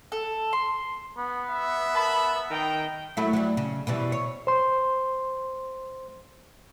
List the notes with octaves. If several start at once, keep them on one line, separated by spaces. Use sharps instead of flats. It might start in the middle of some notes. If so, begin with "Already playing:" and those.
A4
C6
B3
E5
A#4 A5 B5
D#3 G5 A#5
F#3 A3 E4
F#3 G3
C#3
B2 E3 G3
C#5
C5 C6